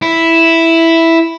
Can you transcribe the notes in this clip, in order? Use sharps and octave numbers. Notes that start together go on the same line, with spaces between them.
E4